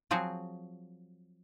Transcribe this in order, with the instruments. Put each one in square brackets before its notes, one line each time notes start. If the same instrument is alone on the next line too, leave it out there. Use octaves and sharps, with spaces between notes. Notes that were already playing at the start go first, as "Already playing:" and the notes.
[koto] F3 F#3 C4 F#4 G#4